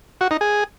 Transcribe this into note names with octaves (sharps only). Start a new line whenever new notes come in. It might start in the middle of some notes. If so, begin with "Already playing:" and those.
F#4
D#4
G#4